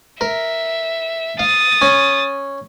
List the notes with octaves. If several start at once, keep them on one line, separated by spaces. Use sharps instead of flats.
A#4 E5
F5 D#6 A6
C#4